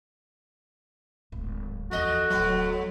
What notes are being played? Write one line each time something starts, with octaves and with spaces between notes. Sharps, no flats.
D1 G#1
E2 F3 A3 F#4 D#5
D1 E2 F#3 A3 B3